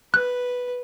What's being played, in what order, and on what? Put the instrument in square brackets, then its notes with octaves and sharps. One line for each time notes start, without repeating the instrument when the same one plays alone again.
[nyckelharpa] B4 [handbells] F#6